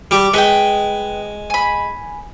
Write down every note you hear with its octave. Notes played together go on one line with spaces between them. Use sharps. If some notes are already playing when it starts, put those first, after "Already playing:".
G3 G4
G#3 B4 D#5 G5
G#5 B5